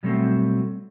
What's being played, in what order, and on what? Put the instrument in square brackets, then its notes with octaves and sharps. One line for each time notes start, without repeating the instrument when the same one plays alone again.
[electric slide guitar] B2 F#3 G3 A3 A#3 C4